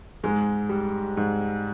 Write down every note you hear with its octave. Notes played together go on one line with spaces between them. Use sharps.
G#2 G#3
G3
G#2